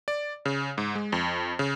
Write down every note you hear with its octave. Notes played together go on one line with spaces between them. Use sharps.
D5
C#3
G#2
G#3
F2
C#3